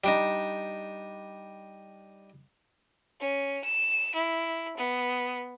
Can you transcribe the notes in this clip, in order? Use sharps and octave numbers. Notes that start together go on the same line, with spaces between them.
G3 D4 D#4
C#4
E7
E4
B3